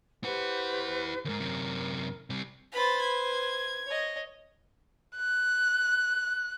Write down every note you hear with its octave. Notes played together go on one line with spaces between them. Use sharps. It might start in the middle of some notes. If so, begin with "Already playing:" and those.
E4 G4 B4 C5 F#5
D#2 G#2 A#4
F#2 C3
C3 G3
B4 C5 B5 A6
G#6
C#5 D#5
F#6